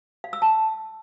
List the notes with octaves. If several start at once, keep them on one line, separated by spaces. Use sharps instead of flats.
F5
E6
A5